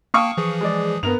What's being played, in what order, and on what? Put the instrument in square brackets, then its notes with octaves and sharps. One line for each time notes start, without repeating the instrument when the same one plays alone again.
[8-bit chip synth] A#3 G5 A5 [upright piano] F5 C#6 D#6
[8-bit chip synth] E3 F3 G#4
[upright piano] G#3 D5
[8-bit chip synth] G2 [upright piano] B3 A#4 F7